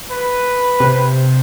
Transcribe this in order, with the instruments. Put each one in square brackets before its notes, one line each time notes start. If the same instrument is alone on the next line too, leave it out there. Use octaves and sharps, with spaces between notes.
[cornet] B4
[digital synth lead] C3